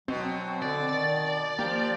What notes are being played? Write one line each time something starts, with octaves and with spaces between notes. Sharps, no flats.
B2 F#3 C4
D3 D5
D#3 A6
F3 A#3 G4